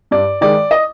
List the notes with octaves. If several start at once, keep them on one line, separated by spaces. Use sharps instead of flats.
G2 D5
D#3 G#3 D5
D#5